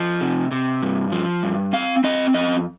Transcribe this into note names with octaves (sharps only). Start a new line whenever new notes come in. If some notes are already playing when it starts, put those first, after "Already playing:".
Already playing: F3 D#5
C3
C3
G2
F3
G2
C4 F5
C4 D#5
F2 D#5